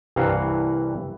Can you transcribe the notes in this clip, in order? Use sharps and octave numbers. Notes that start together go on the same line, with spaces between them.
C2 G2 E3 F5 F#5 A#5